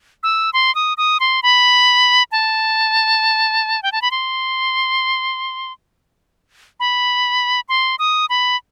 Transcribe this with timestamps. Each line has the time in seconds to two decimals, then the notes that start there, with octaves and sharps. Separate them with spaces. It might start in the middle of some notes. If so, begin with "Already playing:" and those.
0.23 E6
0.53 C6
0.75 D#6
0.97 D#6
1.20 C6
1.43 B5
2.32 A5
3.83 G5
3.92 A5
4.02 B5
4.11 C6
6.80 B5
7.69 C6
7.99 D#6
8.30 B5